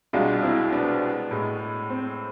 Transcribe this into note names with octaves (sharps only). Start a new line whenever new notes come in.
C2 B2 G#3 D4 F4
C4 E4
B3 D4
A2 G#3
C4